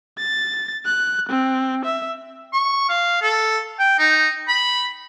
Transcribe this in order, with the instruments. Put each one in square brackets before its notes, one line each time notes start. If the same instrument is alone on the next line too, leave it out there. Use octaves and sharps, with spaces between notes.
[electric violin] A6
F#6
C4
E5
[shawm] C#6
F5
A4
G5
D#4
B5